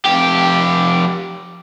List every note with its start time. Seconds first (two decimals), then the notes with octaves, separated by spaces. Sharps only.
0.05 F2 G4